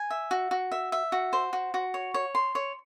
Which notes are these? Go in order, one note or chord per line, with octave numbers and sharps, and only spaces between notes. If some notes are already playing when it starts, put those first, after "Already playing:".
Already playing: G#5
E5
F#4
F#4
E5
E5
F#4
C5
F#4
F#4
C#5
C#5
C6
C#5